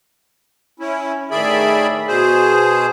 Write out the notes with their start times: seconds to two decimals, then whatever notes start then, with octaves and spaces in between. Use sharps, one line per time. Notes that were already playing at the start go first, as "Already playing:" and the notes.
0.80 C#4 E4
1.31 A2 D#3 G#4 D5 E5 B5
2.08 B2 G#4 C5